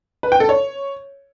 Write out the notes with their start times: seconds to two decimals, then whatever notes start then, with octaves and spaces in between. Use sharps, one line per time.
0.23 B4
0.32 G5
0.40 A4
0.49 C#5